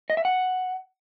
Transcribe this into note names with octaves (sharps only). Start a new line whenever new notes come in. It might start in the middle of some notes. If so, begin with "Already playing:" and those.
D#5
E5
F#5